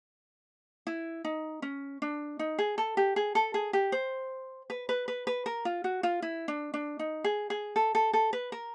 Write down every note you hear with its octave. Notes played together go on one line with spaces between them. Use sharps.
E4
D#4
C#4
D4
D#4
G#4
A4
G4
G#4
A4
G#4
G4
C5
B4
B4
B4
B4
A#4
F4
F#4
F4
E4
D4
D4
D#4
G#4
G#4
A4
A4
A4
B4
A#4